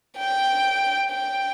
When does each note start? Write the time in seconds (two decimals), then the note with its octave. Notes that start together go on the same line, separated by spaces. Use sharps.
0.18 G5
1.10 G5